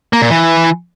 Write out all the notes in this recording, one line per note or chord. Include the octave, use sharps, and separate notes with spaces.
A#3
A#2
E3